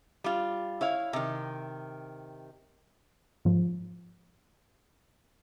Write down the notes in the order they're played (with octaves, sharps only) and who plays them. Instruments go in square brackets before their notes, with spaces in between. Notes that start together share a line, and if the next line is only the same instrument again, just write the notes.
[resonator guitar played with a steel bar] G3 F4
E4 C#5 F5
C3 D#3
[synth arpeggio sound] G#2 F3